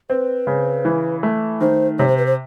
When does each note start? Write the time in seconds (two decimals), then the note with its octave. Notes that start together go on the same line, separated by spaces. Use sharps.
0.10 C4 B4
0.47 C#3
0.85 E3
1.23 A3
1.61 D#3 C5
1.99 C3 C#5
2.08 C5
2.17 B4
2.26 C5